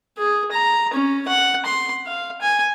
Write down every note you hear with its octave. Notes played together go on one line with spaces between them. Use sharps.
G#4
A#5
C#4
F#5
C6
F5
G#5